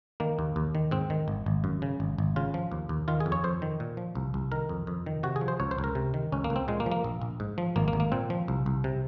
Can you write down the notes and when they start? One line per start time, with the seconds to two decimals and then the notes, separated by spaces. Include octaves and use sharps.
0.20 D#3 A#3
0.39 D#2
0.56 D#2
0.75 D#3
0.91 G#2 C4
1.10 D#3
1.28 G#1
1.46 G#1
1.64 F#2
1.82 C#3
2.00 G#1
2.18 G#1
2.36 C#3 F4
2.54 F3
2.72 D#2
2.89 D#2
3.08 D#3 F4
3.20 G#4
3.26 F2
3.32 C#5
3.44 F2 C5
3.62 D#3
3.80 A#2
3.97 F3
4.15 C2
4.34 C2
4.52 D#3 A#4
4.69 F2
4.87 F2
5.06 D#3
5.23 C3 F#4
5.36 G#4
5.41 F3
5.48 C5
5.60 C#2 C#5
5.71 C5
5.78 C#2
5.84 A#4
5.95 C3
6.14 D#3
6.32 C#2 C#4
6.44 A#3
6.50 C#2
6.56 C4
6.68 A#2 G#3
6.80 A#3
6.86 F3
6.92 A#3
7.04 A#1
7.21 A#1
7.40 G#2
7.58 F3
7.76 G#1 A#3
7.88 A#3
7.93 G#1
8.00 A#3
8.12 A#2 C4
8.30 F3
8.48 C2
8.66 C2
8.84 C3